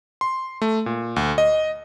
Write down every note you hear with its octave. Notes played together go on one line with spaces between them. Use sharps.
C6
A3
A#2
D2
D#5